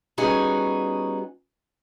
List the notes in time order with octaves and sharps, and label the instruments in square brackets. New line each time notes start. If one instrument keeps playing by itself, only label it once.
[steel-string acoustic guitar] G3 B3 C#4 D#4 F#4 G#4